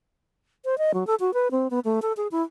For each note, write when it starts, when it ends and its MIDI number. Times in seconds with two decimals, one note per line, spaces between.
0.65 0.78 72
0.78 0.92 75
0.94 1.06 54
1.07 1.15 69
1.20 1.34 66
1.34 1.48 71
1.51 1.68 60
1.71 1.79 59
1.85 2.00 57
2.02 2.13 69
2.17 2.28 68
2.32 2.43 64